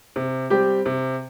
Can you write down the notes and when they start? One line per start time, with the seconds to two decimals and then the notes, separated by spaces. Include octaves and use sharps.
0.16 C3
0.50 G3 C4 G4
0.86 C3